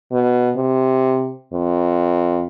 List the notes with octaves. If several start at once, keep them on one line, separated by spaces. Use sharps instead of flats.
B2
C3
F2